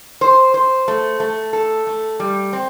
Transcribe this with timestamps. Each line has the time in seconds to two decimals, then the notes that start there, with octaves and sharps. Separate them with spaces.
0.21 C5
0.54 C5
0.88 A3
1.20 A3
1.53 A4
1.87 A3
2.20 G3
2.53 C4